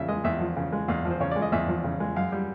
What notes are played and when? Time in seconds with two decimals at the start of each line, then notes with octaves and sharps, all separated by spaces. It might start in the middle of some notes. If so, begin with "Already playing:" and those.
Already playing: E2 C#3 F3 E5
0.08 G#3 D#5
0.24 E2 E5
0.40 F3
0.56 C#3
0.72 G#3
0.88 E2 F5
1.05 F3
1.10 C5
1.20 C#3 C#5
1.31 G#3 D5
1.42 D#5
1.52 E2 E5
1.68 F3
1.84 C#3
2.00 G#3
2.16 F#2 F5
2.32 G3